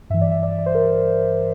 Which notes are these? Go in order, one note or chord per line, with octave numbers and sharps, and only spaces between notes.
G2 E3 E5
D5
E5
D5
D5
C5
A#4